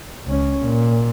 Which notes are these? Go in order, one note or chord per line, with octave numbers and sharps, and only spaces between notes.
C#2 C#4
A#2